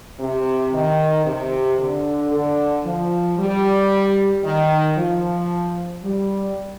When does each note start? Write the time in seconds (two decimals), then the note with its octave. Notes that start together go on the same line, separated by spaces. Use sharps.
0.20 C3
0.73 D#3
1.26 C3
1.79 D3
2.32 D3
2.85 F3
3.39 G3
4.44 D#3
4.97 F3
6.04 G3